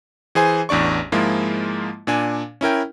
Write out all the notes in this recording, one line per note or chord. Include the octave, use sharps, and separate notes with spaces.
E3 G#4 C5 G#5
A1 E2 D4 D5 C#6
G#2 F3 G#3 A#3 E4 F4
A#2 D4 G#5
C#4 E4 A#4 G5